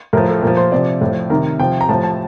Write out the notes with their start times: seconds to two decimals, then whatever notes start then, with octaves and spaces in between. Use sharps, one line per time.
0.13 A2 F3 A#4
0.28 A4
0.42 A#2 F3 A#4
0.57 C5
0.72 C3 F3 D5
1.01 A2 F3
1.30 C3 D#3 A#4
1.59 C3 F3 G5
1.81 A#5
1.89 A2 F3 A5
2.03 A5